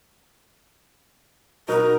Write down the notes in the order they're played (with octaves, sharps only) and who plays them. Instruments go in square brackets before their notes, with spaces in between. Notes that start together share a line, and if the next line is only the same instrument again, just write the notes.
[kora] B2 D#4 F#5 [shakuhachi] A#4